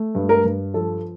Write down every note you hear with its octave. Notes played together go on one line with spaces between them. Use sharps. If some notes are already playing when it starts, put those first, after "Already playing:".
Already playing: A3
G2
A#4
G2
F3 A4